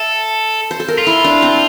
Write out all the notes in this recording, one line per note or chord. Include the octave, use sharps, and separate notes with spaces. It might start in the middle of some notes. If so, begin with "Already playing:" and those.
Already playing: A4 E5
C5
A4
A#4
F4
E4
D4
C4